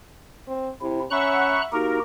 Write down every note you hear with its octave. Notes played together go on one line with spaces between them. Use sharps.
C4
C3 E4
C#4 E5 F#5 A#5 B5 C#6 F#6
A#3 D#4 F#4 G4 A#4